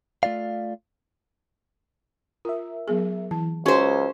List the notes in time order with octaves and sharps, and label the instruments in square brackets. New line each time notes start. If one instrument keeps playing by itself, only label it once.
[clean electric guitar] A3 F4 D5 F5
[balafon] F4 [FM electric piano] A#4 E5
[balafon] F#3 B3 G#4
[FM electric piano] E3 [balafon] A5
[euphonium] C#2 [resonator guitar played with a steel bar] C#4 C5 [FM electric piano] F#4 [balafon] G#4